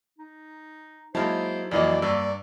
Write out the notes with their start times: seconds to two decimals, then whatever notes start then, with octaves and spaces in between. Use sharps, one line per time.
0.19 D#4
1.15 F#3 G#3 A#3 D#4 E4 C5 A5
1.71 F2 E3 F#3 A#3 E4 D5 D#5
2.02 G2 A#3 D5 E6